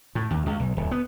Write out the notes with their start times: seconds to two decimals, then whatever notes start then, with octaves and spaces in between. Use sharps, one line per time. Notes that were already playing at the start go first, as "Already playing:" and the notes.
0.15 A2
0.31 D#2
0.46 C#2
0.60 B1
0.77 D1
0.91 B3